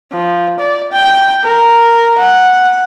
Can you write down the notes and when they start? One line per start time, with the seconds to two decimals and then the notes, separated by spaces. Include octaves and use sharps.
0.12 F3
0.59 D5
0.92 G5
1.44 A#4
2.18 F#5